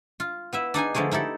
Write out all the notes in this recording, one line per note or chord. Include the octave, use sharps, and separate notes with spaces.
F4
B3 E4 E5
D4 D#4 G#4 G#5
D3 F3 G#3 A3 G#4
D#4 E4 G4 A4